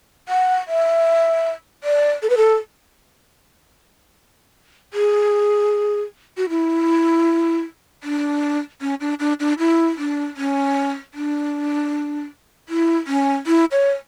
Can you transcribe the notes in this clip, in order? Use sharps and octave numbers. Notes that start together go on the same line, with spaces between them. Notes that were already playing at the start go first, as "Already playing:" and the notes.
F#5
E5
D5
A4
B4
A4
G#4
F#4
E4
D4
C#4
D4
D4
D4
E4
D4
C#4
D4
E4
C#4
E4
C#5